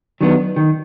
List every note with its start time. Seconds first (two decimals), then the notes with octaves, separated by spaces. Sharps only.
0.21 D#3 F#3 B3 D4
0.56 D#3